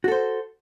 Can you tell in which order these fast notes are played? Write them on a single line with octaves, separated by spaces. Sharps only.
F#4 A4 C5